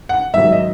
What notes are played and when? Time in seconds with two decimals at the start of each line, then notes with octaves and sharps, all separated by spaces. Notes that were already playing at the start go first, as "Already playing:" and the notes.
0.09 F#5
0.33 G#2 D#3 F#3 E5
0.52 D#5